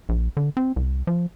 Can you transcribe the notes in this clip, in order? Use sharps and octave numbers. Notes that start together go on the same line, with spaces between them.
A#1
D3
C4
C2
F3